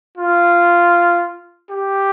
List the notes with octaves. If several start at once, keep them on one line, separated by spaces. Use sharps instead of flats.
F4
G4